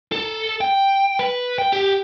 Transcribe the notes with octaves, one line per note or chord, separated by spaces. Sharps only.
A4
G5
B4
G5
G4